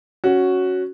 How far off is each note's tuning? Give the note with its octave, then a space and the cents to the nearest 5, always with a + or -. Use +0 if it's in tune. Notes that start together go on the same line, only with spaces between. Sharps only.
C#4 +0 F#4 +0